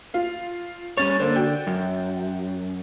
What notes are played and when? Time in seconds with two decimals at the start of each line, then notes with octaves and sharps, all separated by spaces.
0.14 F4 F5
0.97 G3 C#4 C#5 A6
1.20 D3 A#3 C5
1.36 F#4 G5
1.67 F#2